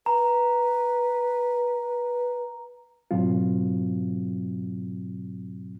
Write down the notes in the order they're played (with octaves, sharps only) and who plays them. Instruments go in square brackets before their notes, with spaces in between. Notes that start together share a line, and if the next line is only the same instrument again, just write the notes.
[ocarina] B4 [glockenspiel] A#5
[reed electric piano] G#2 B2 F#3 C4 F4